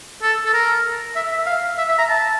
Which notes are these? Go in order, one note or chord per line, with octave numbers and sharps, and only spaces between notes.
A4
A4
A#4
E5
E5
F5
E5
E5
A#5
A5